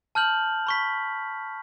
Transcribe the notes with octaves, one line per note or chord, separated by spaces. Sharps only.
A5 F6 G6 F#7
B5 C#6 B6